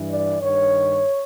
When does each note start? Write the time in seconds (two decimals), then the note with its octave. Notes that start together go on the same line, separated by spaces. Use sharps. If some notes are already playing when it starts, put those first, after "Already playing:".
Already playing: G2 E3
0.09 D5
0.40 G2 D#3 C#5